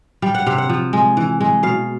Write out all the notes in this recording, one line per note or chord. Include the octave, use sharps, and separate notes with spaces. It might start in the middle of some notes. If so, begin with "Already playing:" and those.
G3 F5
F#5
C3 F5
F#5
F3
G#3
E3
G#3
B2 F5